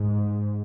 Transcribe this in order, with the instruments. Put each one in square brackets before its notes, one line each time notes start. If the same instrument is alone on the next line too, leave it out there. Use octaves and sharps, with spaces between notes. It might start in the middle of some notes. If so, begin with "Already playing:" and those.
Already playing: [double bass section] G#2